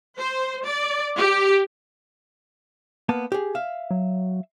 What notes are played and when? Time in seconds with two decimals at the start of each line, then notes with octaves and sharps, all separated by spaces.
0.18 C5
0.65 D5
1.18 G4
3.09 A#3 B3 A5
3.32 G4 G#4
3.55 E5 F5
3.91 F#3